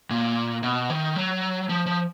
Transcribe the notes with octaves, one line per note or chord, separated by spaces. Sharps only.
A#2
B2
D#3
F#3
F3
F3